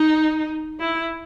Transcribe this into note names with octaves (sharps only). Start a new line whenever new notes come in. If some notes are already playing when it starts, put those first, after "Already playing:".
Already playing: D#4
E4